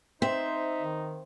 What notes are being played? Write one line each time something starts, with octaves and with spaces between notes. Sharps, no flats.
C4 D#4 C5 E5
D#3